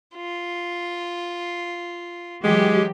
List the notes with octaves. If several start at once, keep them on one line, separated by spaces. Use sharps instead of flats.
F4
E3 F#3 G#3 G4